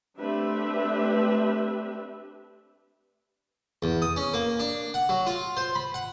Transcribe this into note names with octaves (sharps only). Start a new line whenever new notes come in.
A3 C4 D4 G4 B4 E5
E2
D#6
C#4
A#3
D4
F#5
F#3
F4
C5
B5
F#5